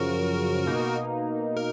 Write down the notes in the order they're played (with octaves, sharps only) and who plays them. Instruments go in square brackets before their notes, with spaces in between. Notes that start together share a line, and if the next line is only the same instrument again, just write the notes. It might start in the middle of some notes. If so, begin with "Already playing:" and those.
Already playing: [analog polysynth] F#2 C#3 F3 [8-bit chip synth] F#4 A#4
[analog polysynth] B2 A#3 D#4
[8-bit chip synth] A#4